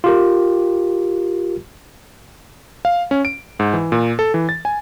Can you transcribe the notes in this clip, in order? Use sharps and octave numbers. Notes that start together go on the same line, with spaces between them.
F4 G4 A#4
F5
C#4
D7
G#2
E3
A#2
A4
E3
A6
G#5